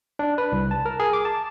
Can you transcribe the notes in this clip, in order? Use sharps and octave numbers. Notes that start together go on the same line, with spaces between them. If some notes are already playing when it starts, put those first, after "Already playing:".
D4
B4
C2
A5
A#4
G#4
D6
A5